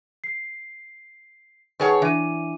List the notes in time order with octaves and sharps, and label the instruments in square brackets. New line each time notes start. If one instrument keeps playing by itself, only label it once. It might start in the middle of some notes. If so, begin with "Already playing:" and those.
[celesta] C7
[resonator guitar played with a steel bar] D#3 G#4 C#5 [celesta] B4 F#5 A5
[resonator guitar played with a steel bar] E3 [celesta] D4 D#7